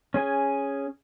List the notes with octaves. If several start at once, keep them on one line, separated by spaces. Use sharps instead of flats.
C#4 G#4 G#5